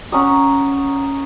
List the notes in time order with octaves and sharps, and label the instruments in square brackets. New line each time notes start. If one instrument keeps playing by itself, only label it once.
[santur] C#4 F#5 A#5 D#6